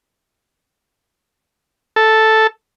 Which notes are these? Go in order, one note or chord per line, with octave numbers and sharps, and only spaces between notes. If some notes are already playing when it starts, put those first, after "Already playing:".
A4